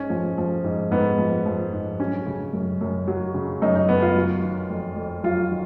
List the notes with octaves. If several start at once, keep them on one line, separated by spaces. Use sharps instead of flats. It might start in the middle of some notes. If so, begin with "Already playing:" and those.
Already playing: G#2 C#4
F3
F3
G#2
G#2 B3
F3
F3
G#2
F#3 C#4
C#3
F#2
F#2
F#3
C#3
F#2 D#4
D#4
F#2 B3
F4
F#3
D#3
F2
F2
F#3 F4
D#3